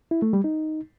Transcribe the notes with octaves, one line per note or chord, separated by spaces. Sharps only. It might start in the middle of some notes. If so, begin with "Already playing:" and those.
E4
A3
G3
D#4